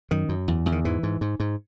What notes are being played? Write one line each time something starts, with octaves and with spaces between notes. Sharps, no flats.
F#2 D#3
F#2
E2
E2
D#3
G#2 E3
G#2
G#2
G#2